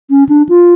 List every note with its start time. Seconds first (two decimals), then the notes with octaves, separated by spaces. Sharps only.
0.10 C#4
0.29 D4
0.49 F4